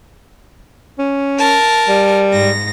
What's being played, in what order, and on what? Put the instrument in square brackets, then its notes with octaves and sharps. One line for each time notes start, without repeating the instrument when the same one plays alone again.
[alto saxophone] C#4
[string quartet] A#4 A5
[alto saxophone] G3
[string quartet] G#2 A#6